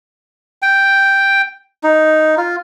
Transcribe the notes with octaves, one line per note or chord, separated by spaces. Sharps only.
G5
D#4
F4